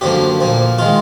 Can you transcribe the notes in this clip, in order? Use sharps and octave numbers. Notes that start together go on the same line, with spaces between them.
F#2 D3 F3 A#3 G4
A#2 F3 A#3
D#3 G#3 F4